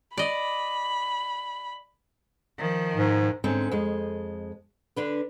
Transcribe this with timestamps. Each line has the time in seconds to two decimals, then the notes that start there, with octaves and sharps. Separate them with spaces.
0.18 D5 D#5 B5
2.59 D#3 F3
2.96 G#2
3.44 G#2 D3 C4 C#4
3.72 F2 G#3
4.96 D3 D4 B4